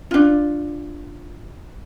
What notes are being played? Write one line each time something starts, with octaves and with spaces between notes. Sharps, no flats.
D4 F4